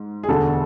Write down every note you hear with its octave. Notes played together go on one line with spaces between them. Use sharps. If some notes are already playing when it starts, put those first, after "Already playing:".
Already playing: G#2
G#4
E1 D2 D3 A4